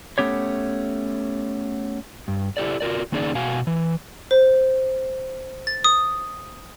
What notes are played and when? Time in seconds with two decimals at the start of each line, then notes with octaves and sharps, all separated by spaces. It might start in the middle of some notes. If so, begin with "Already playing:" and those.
0.18 A3 B3 C#4 G4 C#5
2.28 G2
2.57 E4 G4 A4 D5
2.80 F4 F#4 A#4 D5
3.12 D#3 A#3 C#4 D#4 G#4 D5
3.35 B2 F#4 F5 G#5
3.67 E3
4.31 C5
5.67 A6
5.84 D#6